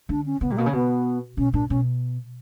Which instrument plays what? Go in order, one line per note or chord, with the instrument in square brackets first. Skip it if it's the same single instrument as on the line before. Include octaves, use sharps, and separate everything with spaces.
[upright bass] D3 [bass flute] D4
[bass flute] C#4
[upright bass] C#3 [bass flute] B3
[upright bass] A#2 [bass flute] G3
[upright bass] B2 [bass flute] A#3
[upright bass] C#3
[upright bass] B2 [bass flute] B3
[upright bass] B2 [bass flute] C#4
[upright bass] A#2 [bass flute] D4
[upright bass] B2 [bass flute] C#4